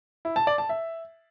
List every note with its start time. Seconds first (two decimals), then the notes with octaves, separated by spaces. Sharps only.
0.25 E4
0.36 A5
0.47 D5
0.58 A5
0.69 E5